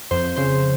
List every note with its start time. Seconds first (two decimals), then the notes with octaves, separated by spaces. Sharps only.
0.11 F2 C5
0.36 C#3 C5